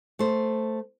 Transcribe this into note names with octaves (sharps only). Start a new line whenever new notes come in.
A3 C5